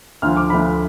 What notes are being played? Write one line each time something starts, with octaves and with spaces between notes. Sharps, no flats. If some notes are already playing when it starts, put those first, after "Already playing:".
D2 D3 F3 F6
D6
D2 D3 F3 B5